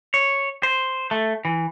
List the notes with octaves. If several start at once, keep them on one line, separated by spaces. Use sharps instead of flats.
C#5
C5
A3
E3